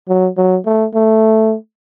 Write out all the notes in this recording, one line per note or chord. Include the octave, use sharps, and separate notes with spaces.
F#3
F#3
A3
A3